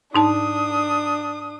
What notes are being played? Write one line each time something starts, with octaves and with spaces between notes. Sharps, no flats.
G#2 D4 D#4 A5 D#6